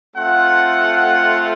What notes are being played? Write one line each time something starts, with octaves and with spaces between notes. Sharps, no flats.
A3 C4 F4 F#5
F#5